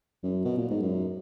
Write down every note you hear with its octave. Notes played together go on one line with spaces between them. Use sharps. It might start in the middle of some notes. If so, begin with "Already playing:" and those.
F#2
B2
A#2
G#2
F#2